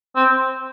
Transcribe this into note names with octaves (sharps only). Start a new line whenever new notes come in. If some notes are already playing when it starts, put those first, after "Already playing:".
C4